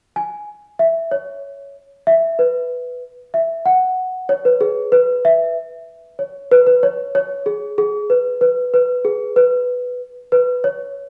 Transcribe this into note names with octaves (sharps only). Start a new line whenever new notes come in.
G#5
E5
C#5
E5
B4
E5
F#5
C#5
B4
G#4
B4
E5
C#5
B4
B4
C#5
C#5
G#4
G#4
B4
B4
B4
G#4
B4
B4
C#5